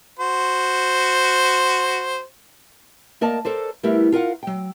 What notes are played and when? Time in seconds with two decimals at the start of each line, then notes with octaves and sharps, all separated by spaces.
0.20 F#4 C5
3.21 A#3 A#4 D5 D#5 A5
3.45 A4 A#4 C5 D5
3.83 G3 A3 B3 E4 A#4
4.12 F4 A#4 F5 F#5
4.43 F#3 G5